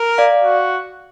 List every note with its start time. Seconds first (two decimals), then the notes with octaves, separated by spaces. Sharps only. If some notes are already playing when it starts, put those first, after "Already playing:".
Already playing: A#4
0.18 D5 F5
0.43 F#4